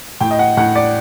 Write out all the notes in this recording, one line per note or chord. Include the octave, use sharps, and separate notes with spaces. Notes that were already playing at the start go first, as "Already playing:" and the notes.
A2 G5
D#5
F#5
A2 F#5
D5